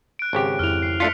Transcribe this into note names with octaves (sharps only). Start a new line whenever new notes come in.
F#6 D7
G#1 C#3 G4
F2 E4 F6 F7
C7
A3 D4 F4 B6 C#7